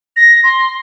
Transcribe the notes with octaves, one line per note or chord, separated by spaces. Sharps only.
A#6
C6